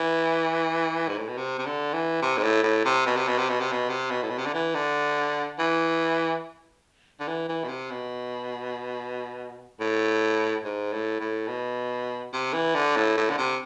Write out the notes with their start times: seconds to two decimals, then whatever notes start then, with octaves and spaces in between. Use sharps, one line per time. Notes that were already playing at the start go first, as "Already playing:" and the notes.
Already playing: E3
1.08 G#2
1.18 A2
1.28 B2
1.37 C3
1.59 C3
1.66 D3
1.93 E3
2.22 C3
2.37 G#2
2.43 A2
2.63 A2
2.85 C3
3.06 B2
3.16 C3
3.28 B2
3.38 C3
3.49 B2
3.60 C3
3.72 B2
3.90 C3
4.11 B2
4.22 A2
4.30 B2
4.38 C3
4.46 D3
4.54 E3
4.75 D3
5.59 E3
7.20 D3
7.28 E3
7.49 E3
7.64 B2
7.69 C3
7.91 B2
9.80 A2
10.64 G#2
10.93 A2
11.20 A2
11.48 B2
12.33 C3
12.53 E3
12.74 D3
12.96 A2
13.17 A2
13.30 D3
13.38 C3